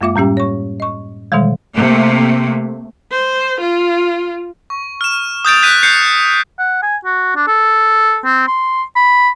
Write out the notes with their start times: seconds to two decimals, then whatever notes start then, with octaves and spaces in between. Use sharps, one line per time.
0.01 F#2 G#3 A#3 F4 E5 D6
0.16 A2 G3 C#4 G4 G5
0.37 C#5 C#6
0.80 D#5 C#6
1.32 B2 D#3 E3 G3 G#3
1.75 C3 A3 A#3
3.12 C5
3.61 F4
4.70 C#6
5.01 F6 E7
5.45 D#6 G6 A6 D7
5.62 F#6 G6 B6 D#7
5.83 G6 C7 C#7
6.59 F#5
6.83 G#5
7.05 F#4
7.36 D4
7.48 A4
8.25 C4
8.47 C6
8.96 B5